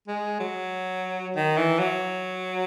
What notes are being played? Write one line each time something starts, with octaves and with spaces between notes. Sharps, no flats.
G#3
F#3
D#3
E3
F#3